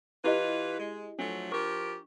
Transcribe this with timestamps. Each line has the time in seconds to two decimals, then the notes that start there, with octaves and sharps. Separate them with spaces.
0.24 E3 E4 F4 G4 B4 D#5
0.79 G#3
1.19 F3 F#3 A3 D4
1.52 F3 G4 A#4 C#6